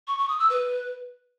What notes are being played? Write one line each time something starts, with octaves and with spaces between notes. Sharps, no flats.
C#6
C#6
D#6
E6
B4